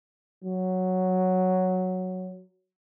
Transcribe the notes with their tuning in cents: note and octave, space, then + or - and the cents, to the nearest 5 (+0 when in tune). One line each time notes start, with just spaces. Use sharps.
F#3 +0